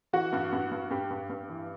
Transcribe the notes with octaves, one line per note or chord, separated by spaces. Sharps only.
E3 F#4
G2
G2
G2
G2 G4
G2
G2
E3